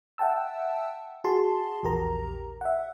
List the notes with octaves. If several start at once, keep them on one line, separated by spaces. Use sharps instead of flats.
E5 F#5 G5 A5 E6
F#4 G#4 A5 C6
A#1 E2 G4 A#4 A#5
E5 F#5